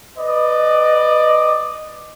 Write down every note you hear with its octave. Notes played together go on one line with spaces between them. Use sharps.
B4 D5 D#5